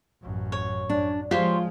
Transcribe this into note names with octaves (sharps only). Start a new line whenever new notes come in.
A1 F#2
C#5
F#2 D4
F3 G#3 F4 G4 C5 C#5